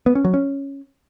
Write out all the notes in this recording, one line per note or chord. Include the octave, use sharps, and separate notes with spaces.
B3
C#4
F#3
C#4